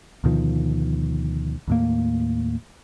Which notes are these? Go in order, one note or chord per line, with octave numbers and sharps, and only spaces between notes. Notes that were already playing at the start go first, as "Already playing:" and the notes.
D2 B2 D#3 F3
D#2 A2 A#3